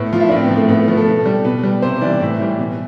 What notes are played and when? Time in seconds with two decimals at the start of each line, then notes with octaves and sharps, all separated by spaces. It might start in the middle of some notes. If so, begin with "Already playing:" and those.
Already playing: A2 B3
0.12 F3 F4
0.20 E4
0.29 D4
0.32 A2 C4
0.44 B3
0.50 F3
0.56 A3
0.69 A2 B3
0.79 A3
0.88 F3 B3
0.97 A4
1.07 B2
1.26 G3
1.45 B2 B4
1.63 G3
1.82 C3 C5
2.01 E3 G3 D5
2.20 A2 E5
2.39 E3 G3
2.59 B2